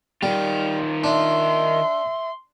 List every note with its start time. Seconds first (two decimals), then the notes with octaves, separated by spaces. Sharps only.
0.23 D#3 G3 F4
1.04 D4 E5 C6